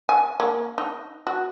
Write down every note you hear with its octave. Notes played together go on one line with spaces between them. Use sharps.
G#5
A#3
D#4
F#4